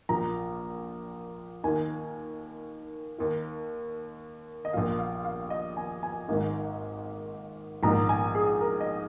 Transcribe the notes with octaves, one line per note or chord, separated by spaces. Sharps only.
A#1 A#2 A#5
D#2 D#3 G#5
D#2 D#3
D#5
A#1 A#2 F5
F5
F5
D#5
G#5
G#5
G#1 G#2 D#3
A#1 G#2 D#3 A#5
G#5
G#4
A#4
D#5